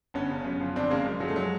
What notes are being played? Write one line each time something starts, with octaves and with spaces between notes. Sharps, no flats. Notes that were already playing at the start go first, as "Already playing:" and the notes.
G1 B3 C#4
C#3
F#2
F3
G1 C4 D4
C#3 G#3 A#3
F#2
F3 F#3 G#3
A3
F#3 G#3